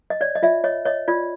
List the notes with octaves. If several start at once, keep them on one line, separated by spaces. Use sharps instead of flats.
D#5
C#5 D5
D#5
F4 D5 E5
C#5 D#5
C#5 D#5
F4 D5